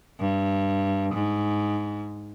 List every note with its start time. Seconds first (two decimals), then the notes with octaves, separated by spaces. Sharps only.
0.20 G2
1.14 G#2